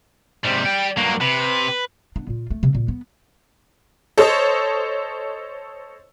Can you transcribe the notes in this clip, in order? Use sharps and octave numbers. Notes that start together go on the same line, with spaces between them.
G#2 C3 G3
G5
G2 F#3 A#3
C3 B4
B3 D4
A#2 F4
A3
C3 C4
A#2
B3
A4 C5 C#5 D#5